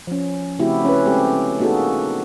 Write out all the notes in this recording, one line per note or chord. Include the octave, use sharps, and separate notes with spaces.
F3 C#4
C#3 A3 C4 E4 F#4 G4
C#4 B4
G#3 C4 G4 A4
A#3 D#4 F#4 G#4 A4